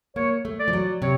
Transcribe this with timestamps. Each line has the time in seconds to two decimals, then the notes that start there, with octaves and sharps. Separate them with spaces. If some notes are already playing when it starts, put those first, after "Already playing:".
0.16 A#3 C#5
0.45 A3
0.59 D5
0.68 F3
0.73 F#3
1.02 C3 C#5